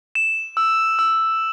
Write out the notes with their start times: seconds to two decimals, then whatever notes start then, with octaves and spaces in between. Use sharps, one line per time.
0.15 E7
0.57 E6
0.99 E6